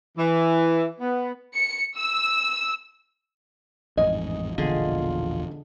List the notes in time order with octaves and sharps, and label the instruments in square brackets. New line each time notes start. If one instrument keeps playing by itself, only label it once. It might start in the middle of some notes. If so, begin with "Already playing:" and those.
[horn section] E3
B3
[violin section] C#7
E6
[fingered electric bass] A1 F2 G#2 [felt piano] D#5 [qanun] G#5
[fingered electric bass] E1 A#1 E2 [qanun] D3 G#4 [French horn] F4